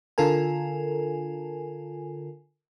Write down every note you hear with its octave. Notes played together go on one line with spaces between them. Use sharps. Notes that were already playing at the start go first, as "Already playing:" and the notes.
D3 F4 A4 A#4 G#5